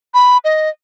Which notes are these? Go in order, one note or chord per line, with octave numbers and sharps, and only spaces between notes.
B5
D#5